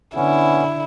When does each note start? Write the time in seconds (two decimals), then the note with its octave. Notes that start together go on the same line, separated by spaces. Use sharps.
0.16 D3 B3 C#4 E4